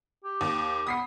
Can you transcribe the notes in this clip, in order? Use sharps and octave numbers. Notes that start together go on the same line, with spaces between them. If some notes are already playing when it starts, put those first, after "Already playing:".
G4
D#2
B3 D#6 B6 C7